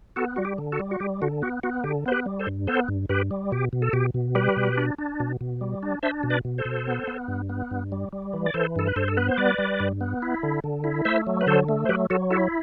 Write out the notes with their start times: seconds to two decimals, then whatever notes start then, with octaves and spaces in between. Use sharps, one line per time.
0.16 B3 F#4 A4
0.36 G3 F#4
0.45 G4
0.58 D3
0.72 F#4 A4
0.80 G3
0.91 F#4
1.00 G3 G4
1.22 D3 F#4
1.42 B3 F#4
1.63 B3 F#4
1.84 D3 G4
2.06 B3 C5
2.12 G4 B4
2.26 G3
2.39 A4 C5
2.47 G2
2.67 B3 A4 C5
2.88 G2
3.09 G2 G4 B4
3.31 G3
3.52 B2 G4
3.73 B2
3.82 A4
3.93 B2 G4
4.14 B2
4.35 G3 G4 B4
4.57 B2
4.78 D4
4.98 D4
5.20 B2
5.41 B2
5.61 G3
5.83 D4
6.03 D4 C5 E5
6.23 B2
6.30 B4 D5
6.45 B2
6.58 A4 C5
6.65 B2
6.87 B3
7.08 B3
7.28 G2
7.49 B3
7.71 G2
7.92 G3
8.13 G3
8.33 E3
8.46 D5
8.54 E3 A4 C5
8.76 G2 A4
8.87 B4
8.96 G2 A4 C5
9.08 A4
9.17 B3 B4
9.28 C5
9.37 G3 B4 D5
9.58 G3
9.80 G2
10.01 B3
10.22 E4
10.43 D3
10.64 D3
10.84 E4
11.05 A3 C5 E5
11.27 F#3
11.41 B4
11.47 D3 A4 C5
11.69 A3
11.85 C5
11.89 F#3 G4 B4
12.10 F#3 F#4 A4
12.30 E4 F#4 A4